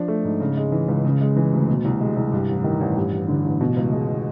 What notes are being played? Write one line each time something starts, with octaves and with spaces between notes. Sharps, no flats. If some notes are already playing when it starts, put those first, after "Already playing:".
Already playing: F3 D4
A3
G#2
C#3
G#3
E3
C#2
C#3
G#3
E3
D2
B2
C2
G#3
C2
G2
A1
D#3
A1
G2
A1
D3
A1
B2
C#2
G#3